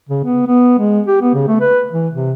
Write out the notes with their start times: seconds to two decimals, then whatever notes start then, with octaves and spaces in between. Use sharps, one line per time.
0.09 C#3
0.25 B3
0.47 B3
0.79 G#3
1.06 G4
1.21 B3
1.34 C#3
1.48 A3
1.61 B4
1.92 E3
2.14 C3